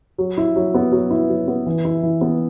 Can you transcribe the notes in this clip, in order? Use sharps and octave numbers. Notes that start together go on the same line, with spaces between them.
F#3
E4
F#3
B3
F#3
E4
F#3
B3
E3
E4
E3
B3